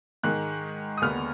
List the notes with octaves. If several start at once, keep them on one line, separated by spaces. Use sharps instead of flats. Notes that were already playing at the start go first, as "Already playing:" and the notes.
G#2 D#3 G#3 F#6
D#6
D#2 D3 G#3 B3 F6